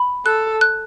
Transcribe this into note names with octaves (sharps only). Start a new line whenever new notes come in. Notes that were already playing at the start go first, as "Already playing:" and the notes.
Already playing: B5
A4 F#6
F#6